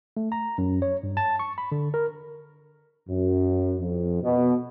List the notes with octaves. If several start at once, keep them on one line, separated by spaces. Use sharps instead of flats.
A3
A#5
F#2
C#5
G2
A5
C#6
B5
D3
A#4
F#2
F2
B2